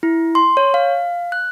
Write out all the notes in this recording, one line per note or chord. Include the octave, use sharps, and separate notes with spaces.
E4
C6
C#5
F5
F#6